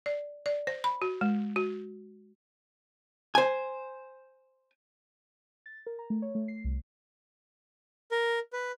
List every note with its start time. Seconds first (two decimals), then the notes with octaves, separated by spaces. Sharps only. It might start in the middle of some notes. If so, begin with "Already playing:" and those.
0.06 D5
0.46 D5
0.67 C5
0.84 B5
1.02 F#4
1.21 G#3
1.56 F#4
3.35 C5 G#5
5.66 A6
5.86 A#4
5.99 A#5
6.10 A3
6.22 C#5
6.35 A3
6.48 C7
6.64 C2
8.11 A#4
8.53 B4